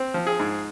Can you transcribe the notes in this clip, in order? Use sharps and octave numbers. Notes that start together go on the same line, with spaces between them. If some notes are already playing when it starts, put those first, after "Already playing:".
Already playing: C4
F3
G#4
G#2